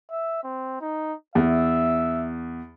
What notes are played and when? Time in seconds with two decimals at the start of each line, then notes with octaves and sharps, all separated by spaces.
0.11 E5
0.44 C4
0.81 D#4
1.35 E2 E5